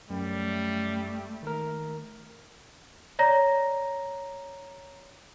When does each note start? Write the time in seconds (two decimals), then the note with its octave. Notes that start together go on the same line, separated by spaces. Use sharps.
0.10 F#2 G3 A3
1.43 D#3 A#4
3.19 C#5 D5 A#5 A#6